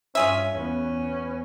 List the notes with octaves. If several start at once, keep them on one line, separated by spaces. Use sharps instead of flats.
G2 C#4 F4 G#4 E5
E2 B3 C#4